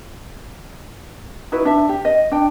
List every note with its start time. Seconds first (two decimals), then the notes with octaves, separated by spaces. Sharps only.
1.52 D#4 E4 F#4 B4
1.65 D4 E5
1.89 G4
2.05 D#5
2.32 D4 G5